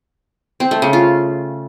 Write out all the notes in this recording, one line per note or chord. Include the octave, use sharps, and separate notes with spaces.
C4
A3
C#3
F4